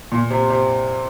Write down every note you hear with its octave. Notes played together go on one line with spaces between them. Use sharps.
A#2
C3
C3